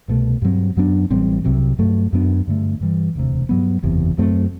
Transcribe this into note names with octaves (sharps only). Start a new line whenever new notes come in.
C2 B2 A3
G2 F#3 C4
F#2 F#3 B3 D4
A1 A2 G3 C4
C2 C3 F#3
G2 F#3 A3
F#2 F#3 B3 D4
G2 D3 A3
G2 E3 G3
E1 D2 C3
G2 F#3 B3
F#1 E2 C3
F#2 F#3 A3 C4